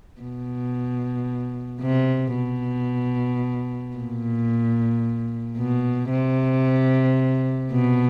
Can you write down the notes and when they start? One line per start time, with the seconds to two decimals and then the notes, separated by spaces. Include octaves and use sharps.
0.21 B2
1.81 C3
2.35 B2
3.97 A#2
5.57 B2
6.11 C3
7.72 B2